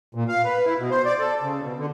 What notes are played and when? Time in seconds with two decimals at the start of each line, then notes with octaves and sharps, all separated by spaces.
0.15 A#2
0.28 F5
0.45 B4
0.66 E4
0.78 B2
0.91 C5
1.05 D5
1.19 A4
1.43 C#3
1.61 B2
1.78 D3